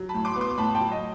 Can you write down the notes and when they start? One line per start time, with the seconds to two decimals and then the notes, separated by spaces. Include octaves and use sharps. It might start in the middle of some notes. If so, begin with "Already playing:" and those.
Already playing: F#3
0.09 A2 A5 B5
0.25 C6 D6
0.36 B3
0.41 C6 D6
0.57 A2 A5 B5
0.75 G5 A5
0.80 F#3
0.91 D#5